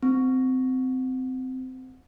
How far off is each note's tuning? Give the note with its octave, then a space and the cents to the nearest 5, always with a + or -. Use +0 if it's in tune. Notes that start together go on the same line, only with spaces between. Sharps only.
C4 -20